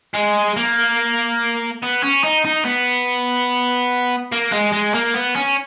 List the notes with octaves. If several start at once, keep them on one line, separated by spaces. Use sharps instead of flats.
G#3
A#3
B3
C#4
D#4
D#4
B3
A#3
G#3
G#3
A#3
B3
C#4